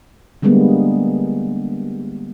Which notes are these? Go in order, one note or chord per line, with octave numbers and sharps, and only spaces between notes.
D3 G3 G#3 A#3 B3